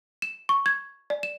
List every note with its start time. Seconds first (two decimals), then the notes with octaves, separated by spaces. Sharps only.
0.22 E7
0.49 C#6
0.66 G#6
1.10 D5
1.23 E7